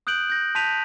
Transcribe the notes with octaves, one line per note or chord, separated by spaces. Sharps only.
D#6 F#6 G6 D7 F#7
G6 A#6
A5 C6 G6 B6 D#7 F7